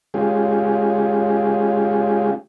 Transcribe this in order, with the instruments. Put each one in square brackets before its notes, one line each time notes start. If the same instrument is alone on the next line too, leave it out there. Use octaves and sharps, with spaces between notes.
[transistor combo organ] G#3 C#4 F4 G4 G#4